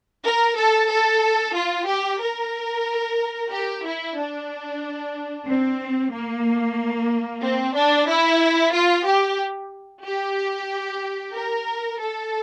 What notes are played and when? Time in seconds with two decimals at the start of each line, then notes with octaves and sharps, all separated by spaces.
0.24 A#4
0.57 A4
0.90 A4
1.56 F4
1.88 G4
2.21 A#4
3.51 G4
3.84 E4
4.17 D4
5.47 C4
6.12 A#3
7.42 C4
7.75 D4
8.08 E4
8.73 F4
9.06 G4
10.04 G4
11.34 A#4
11.99 A4